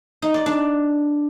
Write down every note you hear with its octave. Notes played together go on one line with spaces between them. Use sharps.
D#4
D5
D4